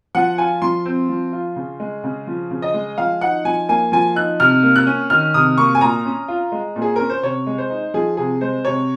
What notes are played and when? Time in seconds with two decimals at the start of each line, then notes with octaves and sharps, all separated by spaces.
0.15 F3 F#5
0.38 F4 G#5
0.62 F3 C6
0.86 C4
1.09 F3
1.33 F4
1.56 C#3
1.80 G#3
2.04 C#3
2.27 F3
2.51 C#3
2.62 D#5
2.74 G#3
2.98 F3 F5
3.21 D#4 F#5
3.45 F3 G#5
3.69 A#3 G#5
3.92 F3 G#5
4.16 D#4 F#6
4.40 C3 F6
4.63 A#3
4.76 F#6
4.87 C#4
5.10 D#3 F6
5.34 C3 D#6
5.58 A#3 C#6
5.75 G#5
5.81 A#2 A#5
6.05 C#4
6.28 F4
6.52 G#3
6.76 A#2
6.82 G#4
6.96 C#4 A#4
7.10 C5
7.23 C3 C#5
7.47 G#3
7.58 C5
7.70 D#4
7.94 F3 G#4
8.17 C3 G#4
8.41 G#3 C5
8.65 C3 C#5